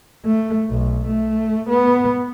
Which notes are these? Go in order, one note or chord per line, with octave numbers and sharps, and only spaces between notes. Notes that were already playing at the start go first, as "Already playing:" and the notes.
A3
B1
A3
B3